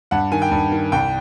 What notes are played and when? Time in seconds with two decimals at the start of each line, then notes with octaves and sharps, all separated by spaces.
0.11 G2 F#5
0.32 D#3 G#5
0.42 G5
0.51 G2
0.72 D#3
0.92 C2 G5